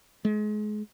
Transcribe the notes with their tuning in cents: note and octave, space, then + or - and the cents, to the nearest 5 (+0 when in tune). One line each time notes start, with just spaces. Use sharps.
G#3 +30